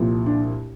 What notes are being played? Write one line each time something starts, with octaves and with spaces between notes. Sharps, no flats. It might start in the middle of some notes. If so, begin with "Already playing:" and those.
Already playing: C2 A#2 F3
D4